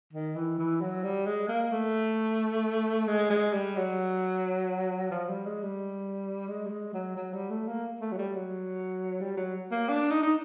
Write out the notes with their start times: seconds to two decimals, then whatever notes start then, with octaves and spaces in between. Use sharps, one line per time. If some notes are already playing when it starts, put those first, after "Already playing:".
0.13 D#3
0.36 E3
0.58 E3
0.81 F#3
1.04 G3
1.27 G#3
1.49 A#3
1.72 A3
3.07 G#3
3.30 G#3
3.53 G3
3.76 F#3
5.11 F3
5.29 G3
5.46 G#3
5.63 G3
6.48 G#3
6.66 G3
6.70 G#3
6.94 F#3
7.17 F#3
7.34 G3
7.51 A3
7.68 A#3
8.01 A3
8.12 F#3
8.18 G3
8.35 F#3
9.21 G3
9.37 F#3
9.72 A#3
9.89 D4
10.11 D#4
10.23 D#4